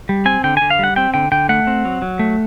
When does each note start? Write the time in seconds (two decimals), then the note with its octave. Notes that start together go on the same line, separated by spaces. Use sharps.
0.09 G3
0.25 C4 G#5
0.44 D3 G5
0.57 D3 G#5
0.70 F5
0.79 G3 F#5
0.96 C4 G5
1.14 D3 G5
1.32 D3 G5
1.49 A3 F#5
1.67 C4
1.85 F#3
2.02 F#3
2.19 A3